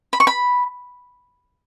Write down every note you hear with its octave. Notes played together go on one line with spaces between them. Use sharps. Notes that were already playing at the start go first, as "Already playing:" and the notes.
B5
C#6
B5